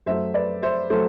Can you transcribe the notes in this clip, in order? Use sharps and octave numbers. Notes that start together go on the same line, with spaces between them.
F#2 F#3 A3 C5 E5
B4 D5
C5 E5
F#3 A3 A4 C5